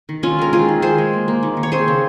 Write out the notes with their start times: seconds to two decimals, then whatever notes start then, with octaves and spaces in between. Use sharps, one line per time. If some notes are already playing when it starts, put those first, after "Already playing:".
0.09 D#3
0.23 C4 C#4 F4
0.39 G#3 A#4
0.53 C4 F4 G#4
0.69 D#3
0.82 D#3 G#4 C5
0.98 G#3
1.13 A#3
1.28 A#3
1.43 D#3
1.57 D#3
1.63 C#5
1.72 C4 G#4 C5
1.88 C#3